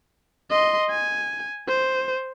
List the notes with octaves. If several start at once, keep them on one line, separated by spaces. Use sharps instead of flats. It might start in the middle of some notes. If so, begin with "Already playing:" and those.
D#5 C6
G#5
C5